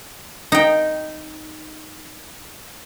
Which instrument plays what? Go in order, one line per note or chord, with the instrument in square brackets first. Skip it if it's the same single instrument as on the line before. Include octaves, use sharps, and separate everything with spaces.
[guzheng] D#4 G5